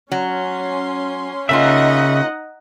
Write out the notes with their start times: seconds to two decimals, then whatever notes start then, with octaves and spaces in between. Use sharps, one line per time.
0.12 F#3 C#4 C6
1.49 C#3 A#3 C#4 D#4 F4 D#5 E5 F#5